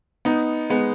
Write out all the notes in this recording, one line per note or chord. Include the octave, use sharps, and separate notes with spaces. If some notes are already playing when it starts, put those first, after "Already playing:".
B3 D#4
G#3 B3